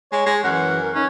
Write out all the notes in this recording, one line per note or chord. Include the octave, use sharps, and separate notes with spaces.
G#3 C#5
G#3
F#2 E3 F#5
A#4
C#4 D#4